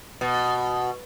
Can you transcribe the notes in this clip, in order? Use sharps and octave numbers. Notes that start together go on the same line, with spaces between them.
B2